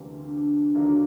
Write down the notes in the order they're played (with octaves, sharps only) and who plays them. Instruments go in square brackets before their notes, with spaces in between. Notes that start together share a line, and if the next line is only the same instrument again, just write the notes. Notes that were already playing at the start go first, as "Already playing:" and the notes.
Already playing: [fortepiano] D2 C3 E3 G3 A#3
[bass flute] D4
[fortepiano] D#2 D3 F#3 A#3